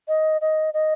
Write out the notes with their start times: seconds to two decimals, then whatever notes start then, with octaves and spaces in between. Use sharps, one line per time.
0.08 D#5
0.41 D#5
0.74 D#5